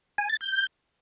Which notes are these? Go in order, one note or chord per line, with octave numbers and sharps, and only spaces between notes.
G#5
A6
G6